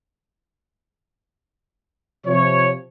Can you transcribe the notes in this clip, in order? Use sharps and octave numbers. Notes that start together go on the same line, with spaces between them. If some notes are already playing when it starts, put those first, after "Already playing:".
C3 F3 C#5